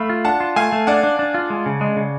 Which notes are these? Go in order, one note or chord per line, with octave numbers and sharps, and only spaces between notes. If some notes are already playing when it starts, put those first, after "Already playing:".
Already playing: A3 F5 B5
F4
D4 F#5 A5
F4
A3 F5 G#5
A3
D4 D5 F#5
D4
D4
F4
G#3
C#3
G#3
C#3